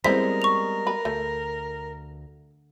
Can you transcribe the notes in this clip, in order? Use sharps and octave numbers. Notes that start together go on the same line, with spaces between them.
G3 G#3 B3 C4 E4 A#4 C5 B6
C#6 F7
B4
D2 A3